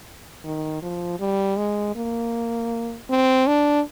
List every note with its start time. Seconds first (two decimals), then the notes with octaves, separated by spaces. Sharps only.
0.44 D#3
0.82 F3
1.20 G3
1.57 G#3
1.95 A#3
3.09 C4
3.47 D4